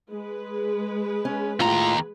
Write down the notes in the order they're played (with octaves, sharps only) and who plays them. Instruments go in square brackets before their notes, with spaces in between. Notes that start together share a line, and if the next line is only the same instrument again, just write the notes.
[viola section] G#3 B4
[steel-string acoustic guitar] C#4
[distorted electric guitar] D#2 A#5 [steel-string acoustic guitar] A2 F4